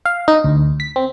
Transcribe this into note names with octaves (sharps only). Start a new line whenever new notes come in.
F5
D#4
D2
B6
C4